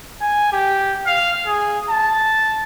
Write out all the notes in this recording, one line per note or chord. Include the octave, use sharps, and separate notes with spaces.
G#5
G4
F5
G#4
A5